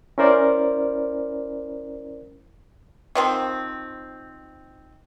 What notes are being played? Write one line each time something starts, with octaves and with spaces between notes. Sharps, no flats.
C#4 E4 A#4 C5 D5
D#3 F3 C4